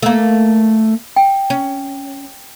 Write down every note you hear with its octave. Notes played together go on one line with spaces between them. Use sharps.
A3 A#3
G5
C#4